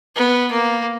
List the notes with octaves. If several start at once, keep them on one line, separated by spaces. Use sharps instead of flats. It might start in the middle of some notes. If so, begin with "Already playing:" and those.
B3
A#3